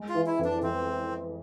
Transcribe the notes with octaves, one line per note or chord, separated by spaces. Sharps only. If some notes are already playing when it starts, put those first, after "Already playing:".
Already playing: G#3
F4
E3
E4
F2
D4
F2 C4